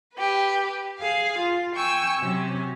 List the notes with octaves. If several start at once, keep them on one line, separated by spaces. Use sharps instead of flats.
G4 B4
G#4 F5
F4
G5 G#5 C#6 E6
C3 F#3 C#4